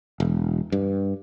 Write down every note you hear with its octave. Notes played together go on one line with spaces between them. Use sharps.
E1
G2